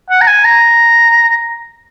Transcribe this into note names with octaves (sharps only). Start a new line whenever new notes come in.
F#5
A#5
G#5
A#5